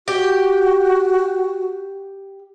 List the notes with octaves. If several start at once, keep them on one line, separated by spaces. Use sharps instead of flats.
F#4 G4